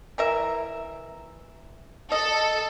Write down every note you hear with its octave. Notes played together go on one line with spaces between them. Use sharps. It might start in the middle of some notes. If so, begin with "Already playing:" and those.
E3 A#4 E5
A4 D#5